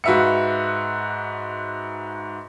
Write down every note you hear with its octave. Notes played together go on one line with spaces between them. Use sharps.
G#2 F#4 B4 E5 F5 C#7